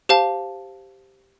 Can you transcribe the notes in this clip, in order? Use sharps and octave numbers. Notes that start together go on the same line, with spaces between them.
G4 C5 F5 A5